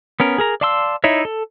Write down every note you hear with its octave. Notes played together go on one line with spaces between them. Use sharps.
B3 C#4 A#4
G#4 A#4 A#5
D5 F5 A5 C6 E6
D#4 E4 C#5 E5
A4